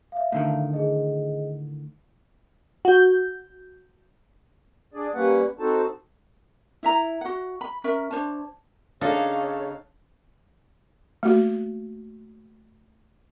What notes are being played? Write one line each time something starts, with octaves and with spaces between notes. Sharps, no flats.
E5 F5
A2 D3 D#3
G#4 D#5
F#4 G6
D4 G#4 D5
G3 A#3 C#4 B4 F#5
C4 D#4 F#4 A4 C5 A5
E4 E5 A#5
F#4 F#5
B5
C#4 A#4 E5
D4 C5 C#5 A5
C#3 D4 D#4 A4 C#5 F5
A3 A#3 F#4